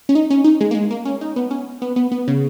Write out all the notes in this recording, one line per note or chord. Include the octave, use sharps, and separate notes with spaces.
C#4
D#4
C#4
D#4
G#3
A#3
G#3
A#3
C#4
D#4
B3
C#4
B3
B3
B3
C#3